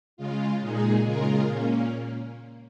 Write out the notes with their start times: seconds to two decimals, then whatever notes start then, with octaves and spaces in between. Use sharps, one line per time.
0.17 C#3 G#3 F4
0.61 A#2 G#3 D#4 G#4
1.04 C#3 G#3 F4 A#4
1.47 A#2 A#3 C#4